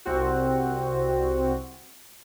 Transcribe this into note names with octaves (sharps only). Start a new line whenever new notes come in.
C2 C4 F#4